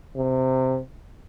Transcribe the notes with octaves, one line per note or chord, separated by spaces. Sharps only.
C3